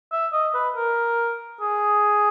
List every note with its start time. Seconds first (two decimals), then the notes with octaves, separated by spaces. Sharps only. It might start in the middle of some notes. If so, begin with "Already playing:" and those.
0.12 E5
0.33 D#5
0.55 B4
0.76 A#4
1.61 G#4